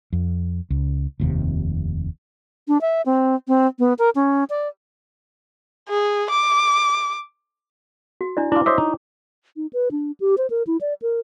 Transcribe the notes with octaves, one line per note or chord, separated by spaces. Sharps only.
F2
C#2
F1 D#2 C3
D4
E5
C4
C4
B3
A#4
C#4
D5
G#4
D6
F#4
D4 E4 D5
D4 E4 F4 D6
C5 C#5 D#5 E5 C6 D6
D#4
D#4
B4
D4
G4
C5
A#4
E4
D5
A#4